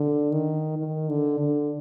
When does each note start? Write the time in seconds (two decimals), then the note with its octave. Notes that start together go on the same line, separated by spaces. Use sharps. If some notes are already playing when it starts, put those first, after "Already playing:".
Already playing: D3
0.31 D#3
0.77 D#3
1.09 D3
1.39 D3